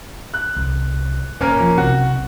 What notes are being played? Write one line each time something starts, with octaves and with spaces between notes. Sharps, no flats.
F#6
C2
D#1 A#3 C#4 A#4
F3
B1 C3 F#4